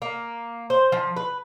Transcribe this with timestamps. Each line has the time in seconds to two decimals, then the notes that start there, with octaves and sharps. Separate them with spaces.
0.02 A#3
0.70 C5
0.92 F3
1.16 B4